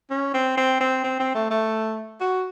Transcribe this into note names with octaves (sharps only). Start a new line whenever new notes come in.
C#4
C4
C4
C4
C4
C4
A3
A3
F#4